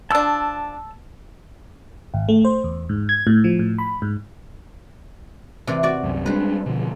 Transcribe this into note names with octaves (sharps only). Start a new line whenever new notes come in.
F3 D4 A5 E6
G#1
A3
C5
E2
G#2
G#6
A2
F3
A2
B5
G#2
C3 E3 D5
F#4 D5
C2 F#2
G3 G#3 D4 B4 C5
B2 D3 F3